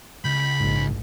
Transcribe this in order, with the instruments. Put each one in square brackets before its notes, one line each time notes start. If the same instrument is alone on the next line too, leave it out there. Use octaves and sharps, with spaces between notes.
[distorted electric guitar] C#2 [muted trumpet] B5 [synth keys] G6 B6
[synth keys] A#1 G#2